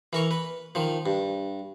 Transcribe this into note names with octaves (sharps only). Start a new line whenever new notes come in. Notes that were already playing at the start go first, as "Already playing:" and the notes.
E3 A#4 C#6
B4
D#3 F3
G2